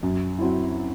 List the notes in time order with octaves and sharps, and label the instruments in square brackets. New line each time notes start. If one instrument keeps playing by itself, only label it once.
[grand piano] F#2
F#3 C4 E4